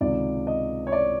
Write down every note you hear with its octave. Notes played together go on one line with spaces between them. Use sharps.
C#2 C3 D#3 D5
D#5
C#5
D5